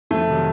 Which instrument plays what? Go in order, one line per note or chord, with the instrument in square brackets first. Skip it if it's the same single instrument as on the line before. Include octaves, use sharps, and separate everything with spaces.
[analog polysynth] F2 [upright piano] A3
[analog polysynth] C3 D#3 F#3